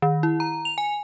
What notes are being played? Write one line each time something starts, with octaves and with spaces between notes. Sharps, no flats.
D#3
E4
A#5
F7
G#5